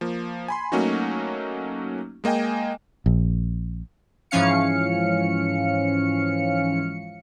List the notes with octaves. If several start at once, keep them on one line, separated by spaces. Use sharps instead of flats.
F3 A#3
G#5 B5 C6
F#3 A3 A#3 C#4 D#4 F#4
G#3 A#3 D#5 G5 G#5
A#1
G#2 E3 F3 C#4 F5 C#7